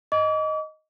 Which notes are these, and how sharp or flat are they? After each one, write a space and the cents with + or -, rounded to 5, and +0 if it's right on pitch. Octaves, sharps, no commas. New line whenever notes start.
D#5 +0 D6 -40